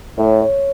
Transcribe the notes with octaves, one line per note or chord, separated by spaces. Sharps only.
A2 C#5
C#5